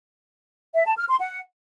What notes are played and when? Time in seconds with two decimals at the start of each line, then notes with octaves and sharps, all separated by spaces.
0.75 E5
0.86 A5
0.97 F6
1.09 C6
1.20 F#5